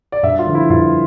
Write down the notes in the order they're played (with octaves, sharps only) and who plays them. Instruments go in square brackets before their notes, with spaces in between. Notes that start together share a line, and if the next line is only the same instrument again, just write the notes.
[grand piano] D5
G2 E5
F4
D3 F3
E4
G2 F4